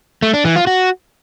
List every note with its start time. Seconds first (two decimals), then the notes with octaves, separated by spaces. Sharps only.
0.22 A3
0.34 D4
0.45 E3
0.56 F4
0.67 F#4